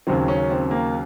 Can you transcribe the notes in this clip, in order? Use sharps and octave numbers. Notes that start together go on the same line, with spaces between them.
D#2 C#3 F#3 C4
C#4
C4
A#3